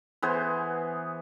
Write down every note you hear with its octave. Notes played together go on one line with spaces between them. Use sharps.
E3 B3 G#4 C5